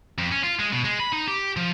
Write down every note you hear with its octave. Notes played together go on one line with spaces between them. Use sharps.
F2
C#4
F4
G#3
B2
G#3
B5
D#4
G4
F3